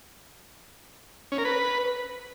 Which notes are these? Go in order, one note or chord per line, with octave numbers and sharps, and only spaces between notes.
C#4
A#4
B4